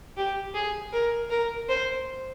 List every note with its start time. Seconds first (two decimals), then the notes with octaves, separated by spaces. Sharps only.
0.17 G4
0.54 G#4
0.93 A#4
1.30 A#4
1.69 C5